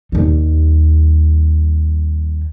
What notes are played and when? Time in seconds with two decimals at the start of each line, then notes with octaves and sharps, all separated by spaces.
0.12 D#2 G3